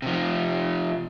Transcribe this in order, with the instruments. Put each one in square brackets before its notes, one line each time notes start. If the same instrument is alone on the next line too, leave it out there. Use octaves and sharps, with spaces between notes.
[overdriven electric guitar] C3 F3